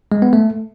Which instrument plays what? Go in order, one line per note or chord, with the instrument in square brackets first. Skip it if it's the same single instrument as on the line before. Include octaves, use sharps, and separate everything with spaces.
[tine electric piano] G#3
B3
A3